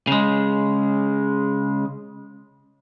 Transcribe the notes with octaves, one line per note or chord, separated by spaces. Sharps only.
C#3 G#3